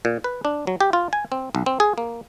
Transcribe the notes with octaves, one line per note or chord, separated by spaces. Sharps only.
A#2
B4
D4
F#3
G4
F4
G#5
C4
B1
C4
G#4
A#3